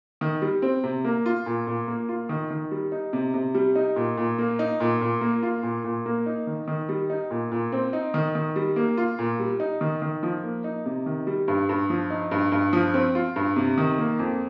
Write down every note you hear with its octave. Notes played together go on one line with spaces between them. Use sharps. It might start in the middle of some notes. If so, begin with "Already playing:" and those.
D#3
G3
C4
C3
A#3
F4
A#2
A#2
A#3
F4
D#3
D#3
G3
D#4
C3
C3
G3
D#4
A#2
A#2
A#3
D#4
A#2
A#2
A#3
F4
A#2
A#2
A#3
D#4
D#3
D#3
G3
D#4
A#2
A#2
C4
D#4
D#3
D#3
G3
A#3
F4
A#2
G3
D#4
D#3
D#3
F3
A#3
D#4
C3
D#3
G3
G2
G2
F3
D#4
G2
G2
F3
C4
F4
G2
C3
D#3
A#3
F2